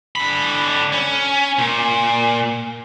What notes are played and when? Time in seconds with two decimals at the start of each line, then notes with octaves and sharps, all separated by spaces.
0.16 D3 B5
0.92 C#4
1.59 A#2